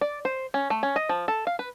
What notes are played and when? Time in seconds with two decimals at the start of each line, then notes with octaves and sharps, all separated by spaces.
0.01 D5
0.25 C5
0.54 C#4
0.70 A3
0.83 C#4
0.96 D#5
1.09 F3
1.28 A4
1.47 F5
1.59 B4